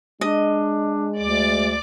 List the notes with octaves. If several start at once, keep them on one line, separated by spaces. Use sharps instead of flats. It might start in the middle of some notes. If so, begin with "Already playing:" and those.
G#3 D4 D#5
D2 D5 D6